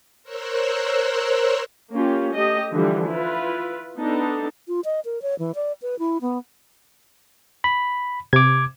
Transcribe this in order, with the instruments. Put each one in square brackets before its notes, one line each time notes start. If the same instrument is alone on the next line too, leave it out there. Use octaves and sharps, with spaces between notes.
[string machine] A#4 C5 C#5 E6 F#6
[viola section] A#3 C#4 F4 G4
A3 G4 D#5
D3 E3 F3 G3
E4 F4 B4
B3 D4 D#4 A4 A5
[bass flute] F4
D#5
A#4
C#5
E3
D5
B4
E4
B3
[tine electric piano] B5
[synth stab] C3 [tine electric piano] D6 G#6